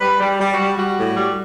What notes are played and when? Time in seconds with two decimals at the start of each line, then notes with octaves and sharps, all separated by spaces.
0.01 G3 B4
0.20 G3
0.40 G3
0.52 F#4
0.59 G3
0.78 G3 F#4
0.97 A2
1.17 G3